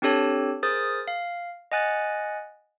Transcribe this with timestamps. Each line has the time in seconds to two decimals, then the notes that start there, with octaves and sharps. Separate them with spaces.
0.02 C4 D4 G4 A4 C#5 A5
0.63 G#4 A#4 C5 D#6 A6
1.08 F5
1.72 D#5 F#5 G#5 F#6 A6